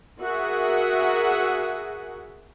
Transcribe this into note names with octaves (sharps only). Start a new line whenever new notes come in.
F#4 G#4 A#4 E5 F#5